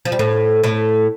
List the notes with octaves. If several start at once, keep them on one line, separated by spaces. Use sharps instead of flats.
F3
G3
A2 A3
A2 A3